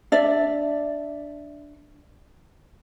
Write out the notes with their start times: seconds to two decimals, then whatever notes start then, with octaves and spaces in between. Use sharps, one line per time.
0.12 D4 D5 E5